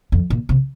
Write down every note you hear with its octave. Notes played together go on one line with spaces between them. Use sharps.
F2
A#2
C3